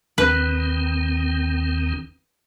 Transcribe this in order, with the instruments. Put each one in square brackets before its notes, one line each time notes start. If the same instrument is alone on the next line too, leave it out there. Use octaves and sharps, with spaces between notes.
[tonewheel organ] D#2 D#3 C4 [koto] B4